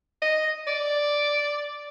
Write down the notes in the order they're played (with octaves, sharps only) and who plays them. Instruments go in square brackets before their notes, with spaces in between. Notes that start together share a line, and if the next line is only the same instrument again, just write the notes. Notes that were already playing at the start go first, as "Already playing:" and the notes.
[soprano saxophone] D#5
D5